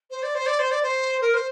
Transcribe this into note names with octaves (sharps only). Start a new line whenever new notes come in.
C5
D5
C5
D5
C5
D5
C5
A#4
C5